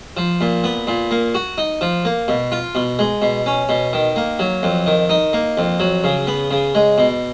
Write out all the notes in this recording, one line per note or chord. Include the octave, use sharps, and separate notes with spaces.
F3
A#2
B3
A#2
A#3
F#4
D#4
F3
A#3
B2
F4
B2
G#3
B2
C#4
B2
D#3
A#3
F#3
F2
D#3
D#4
A#3
F2
F#3
C#3
B3
C#3
G#3
B2